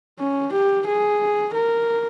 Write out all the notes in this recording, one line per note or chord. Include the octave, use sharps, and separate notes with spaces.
C#4
G4
G#4
A#4